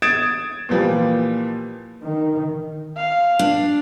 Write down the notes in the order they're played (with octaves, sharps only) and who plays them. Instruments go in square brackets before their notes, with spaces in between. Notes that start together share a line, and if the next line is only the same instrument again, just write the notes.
[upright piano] D#6 G#6 A6 D7 E7
A#2 E3 F3 G3
[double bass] D#3
[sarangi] F5
[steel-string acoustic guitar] D4